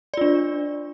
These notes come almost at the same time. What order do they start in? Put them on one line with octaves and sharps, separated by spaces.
D5 F4 D4